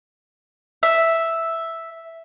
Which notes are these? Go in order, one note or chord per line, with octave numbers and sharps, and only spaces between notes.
E5